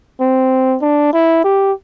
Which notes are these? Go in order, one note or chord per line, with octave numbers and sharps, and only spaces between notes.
C4
D4
E4
G4